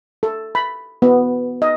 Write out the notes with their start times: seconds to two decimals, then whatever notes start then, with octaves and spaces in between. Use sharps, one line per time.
0.23 A4
0.55 B5
1.02 B3
1.62 D#5